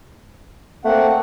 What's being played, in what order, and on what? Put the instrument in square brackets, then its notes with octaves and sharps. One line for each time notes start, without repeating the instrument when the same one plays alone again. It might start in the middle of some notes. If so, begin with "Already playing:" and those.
[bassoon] A3 [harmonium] A#3 C4 F#5